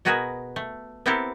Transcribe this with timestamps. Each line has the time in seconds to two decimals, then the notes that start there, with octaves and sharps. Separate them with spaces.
0.05 B2 B3 F#4 G#4 A#4 G#5
0.56 A3
1.06 B3 C4 E4 G4 A4 A#4